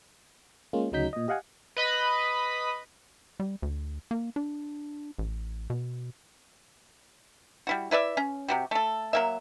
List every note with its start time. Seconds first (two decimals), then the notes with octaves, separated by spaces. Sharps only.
0.73 G#3 A#3 C#4 F4
0.92 D2 C#3 F#3 D#4 G6 B6
1.13 A#2 D#5
1.28 G4 D#5 F5 F#5 G#5
1.77 B4 D#5 B5
3.40 G3
3.62 D2
4.11 A#3
4.36 D4
5.18 A1
5.70 B2
7.67 G3 E4 F#4
7.91 E4 B4 D5 E5
8.17 C#4
8.48 C3 F#4 G4
8.71 A3 A4
9.13 F#3 A#3 E5